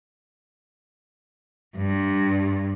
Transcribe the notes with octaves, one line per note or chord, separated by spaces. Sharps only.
G2